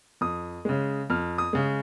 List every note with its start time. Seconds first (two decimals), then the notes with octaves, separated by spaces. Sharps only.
0.21 F2 D#6
0.65 C#3 G#3
1.10 F2 F6
1.38 D#6
1.53 C#3 G#3